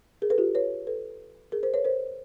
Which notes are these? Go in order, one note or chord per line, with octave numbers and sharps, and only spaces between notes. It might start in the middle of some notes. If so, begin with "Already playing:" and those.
G#4 A#4
A4 B4
F4 G4
B4 C#5
A4 B4
G#4 A#4
A#4 C5
B4 C#5
A#4 C5